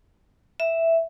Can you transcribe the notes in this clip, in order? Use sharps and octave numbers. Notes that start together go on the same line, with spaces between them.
E5